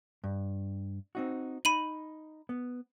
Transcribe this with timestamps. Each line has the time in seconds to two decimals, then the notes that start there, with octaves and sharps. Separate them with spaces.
0.24 G2
1.15 C4 D#4 F#4
1.65 D#4 B5 D#7 F#7
2.49 B3